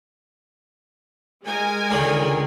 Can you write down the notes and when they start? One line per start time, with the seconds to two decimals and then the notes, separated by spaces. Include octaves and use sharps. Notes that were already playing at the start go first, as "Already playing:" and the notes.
1.46 G#3 A#4 G#5
1.91 C#2 D3 D#3